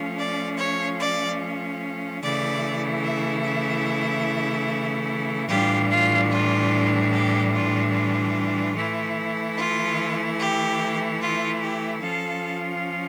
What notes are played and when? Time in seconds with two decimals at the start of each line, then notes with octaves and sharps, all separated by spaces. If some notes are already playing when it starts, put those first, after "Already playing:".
Already playing: F3 A3 C#4 F4
0.17 D5
0.57 C#5
0.99 D5
2.21 C#3 E3 A3 E4 D5
3.04 E5
3.44 E5
5.48 A2 E3 G3 D4 F4 G4
5.89 F4
6.29 F4
7.12 G4
7.53 F4
7.92 F4
8.75 E3 A3 E4
9.56 F4
10.39 G4
11.19 F4
11.61 G4
12.01 F3 C#4 F4 A4